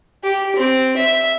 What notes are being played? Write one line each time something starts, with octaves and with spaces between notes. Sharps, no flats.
G4
C4
E5